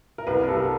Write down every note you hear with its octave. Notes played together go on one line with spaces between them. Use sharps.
A#4
C2 B4
A#4
G3 A4